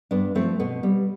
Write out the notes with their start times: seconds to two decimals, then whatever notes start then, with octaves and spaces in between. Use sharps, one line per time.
0.11 G2 B3 D4
0.35 F3 A3 C4
0.60 B2 B3
0.83 G3